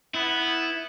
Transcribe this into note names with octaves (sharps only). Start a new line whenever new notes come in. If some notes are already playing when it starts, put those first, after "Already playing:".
B3 E4